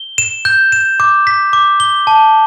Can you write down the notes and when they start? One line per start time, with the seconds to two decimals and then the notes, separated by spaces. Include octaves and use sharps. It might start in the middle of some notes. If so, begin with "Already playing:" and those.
Already playing: G7
0.18 E7
0.45 G6
0.72 E7
1.00 D6
1.27 B6
1.53 D6
1.80 G7
2.07 A5